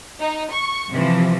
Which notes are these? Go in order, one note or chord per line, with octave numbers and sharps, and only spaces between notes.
D#4
C#6
C3 E3 F3